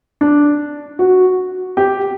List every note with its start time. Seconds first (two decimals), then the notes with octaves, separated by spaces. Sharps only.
0.21 D4
0.99 F#4
1.77 G4